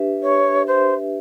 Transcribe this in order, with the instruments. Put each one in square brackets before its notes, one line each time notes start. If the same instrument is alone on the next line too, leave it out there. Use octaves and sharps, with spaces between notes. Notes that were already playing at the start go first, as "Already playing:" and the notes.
Already playing: [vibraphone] D4 G4 B4 E5
[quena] C#5
[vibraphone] D4 G4 B4 E5 [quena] C5